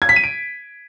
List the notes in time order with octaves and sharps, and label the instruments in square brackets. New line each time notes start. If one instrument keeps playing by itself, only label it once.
[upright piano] G#6
B6
D#7
D7